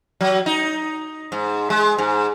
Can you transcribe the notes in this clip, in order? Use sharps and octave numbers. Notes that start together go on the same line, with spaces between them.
F#3
D#4
G#2
G#3
G#2